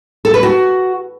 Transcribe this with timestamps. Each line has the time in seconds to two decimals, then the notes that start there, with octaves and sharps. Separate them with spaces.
0.25 A4
0.34 B4
0.43 F#4